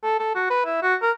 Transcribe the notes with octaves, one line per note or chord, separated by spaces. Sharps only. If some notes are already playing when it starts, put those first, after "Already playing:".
A4
A4
F#4
B4
E4
F#4
A#4